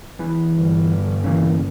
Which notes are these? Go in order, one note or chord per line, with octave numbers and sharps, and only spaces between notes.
E2 E3
G1
C#3 E3 A#3